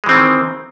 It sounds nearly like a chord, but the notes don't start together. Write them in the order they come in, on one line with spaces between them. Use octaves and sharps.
G#3 E3 C4 D#3